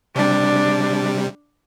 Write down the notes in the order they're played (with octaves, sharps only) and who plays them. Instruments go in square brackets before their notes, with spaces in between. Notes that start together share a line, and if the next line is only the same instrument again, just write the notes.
[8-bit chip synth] C3 G3 [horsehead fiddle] D4